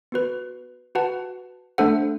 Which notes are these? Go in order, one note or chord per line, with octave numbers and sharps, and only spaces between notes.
B3 F#4 B4
F#4 B4 F#5 A5
A3 D4 A4 C5 F#5